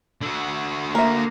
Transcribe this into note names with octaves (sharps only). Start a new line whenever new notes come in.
D3 F#4
A#3 A#4 E5